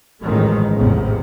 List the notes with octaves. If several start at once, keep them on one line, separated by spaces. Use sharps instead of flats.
A1 F2 D#3 G#3 A3
A1 E2 G#2 C3